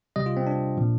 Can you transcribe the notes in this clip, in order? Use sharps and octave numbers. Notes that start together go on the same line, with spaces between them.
C3 G3 D#5
F4
C4
D4
A#2 F3